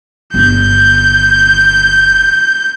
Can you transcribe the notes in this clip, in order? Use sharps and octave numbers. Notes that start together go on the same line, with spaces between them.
G1 D3 G6